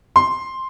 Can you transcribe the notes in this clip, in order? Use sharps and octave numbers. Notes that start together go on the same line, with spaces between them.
C6